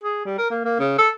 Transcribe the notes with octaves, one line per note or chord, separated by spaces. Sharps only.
G#4
G3
A#4
A#3
A#3
C#3
A4